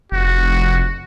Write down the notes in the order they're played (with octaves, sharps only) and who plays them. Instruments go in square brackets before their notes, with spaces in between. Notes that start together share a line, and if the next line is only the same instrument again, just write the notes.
[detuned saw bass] F1 [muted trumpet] F#4